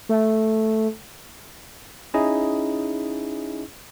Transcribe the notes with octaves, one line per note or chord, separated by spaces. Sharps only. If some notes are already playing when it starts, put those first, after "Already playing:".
A3
C#4 D#4 E4 G#4 D#5